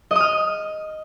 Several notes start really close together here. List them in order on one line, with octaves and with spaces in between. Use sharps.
D#5 D#6 F6